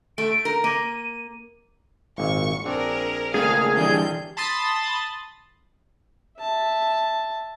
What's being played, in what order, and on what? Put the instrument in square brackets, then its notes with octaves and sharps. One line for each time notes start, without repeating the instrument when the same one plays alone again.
[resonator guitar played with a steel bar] A3 [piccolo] D7
[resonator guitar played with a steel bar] A#4
[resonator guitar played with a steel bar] A#3 [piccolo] D#7
[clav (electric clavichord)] G#1 A#2 [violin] C#6
[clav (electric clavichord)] A#1 C4 D4 [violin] G#4 A#4
[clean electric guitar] C#3 A3 A#3 [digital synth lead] G#4 [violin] F5
[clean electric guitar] D3 E3 G3 [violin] G6
[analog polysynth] A5 B5 C6 D#6 A6
[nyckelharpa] E5 A5